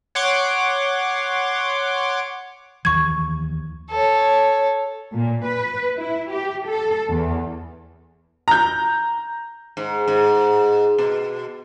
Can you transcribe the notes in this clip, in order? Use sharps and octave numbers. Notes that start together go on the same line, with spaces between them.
C#5 F#5 C6 D6
D#2 E3 F3 C#6 G#6
A4 C#5
A#2
B4
E4
G4
A4
E2
A#5 G6
G#2
G#2
B2